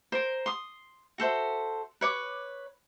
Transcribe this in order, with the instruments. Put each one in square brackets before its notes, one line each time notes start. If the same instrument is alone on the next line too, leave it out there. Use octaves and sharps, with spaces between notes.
[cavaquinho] A#4 C5
C6 D#6
F#4 A4 C5 E5
B4 C#5 D6